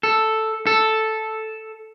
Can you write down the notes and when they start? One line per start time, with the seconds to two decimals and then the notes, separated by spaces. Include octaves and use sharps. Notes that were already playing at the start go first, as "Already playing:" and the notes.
0.03 A4
0.67 A4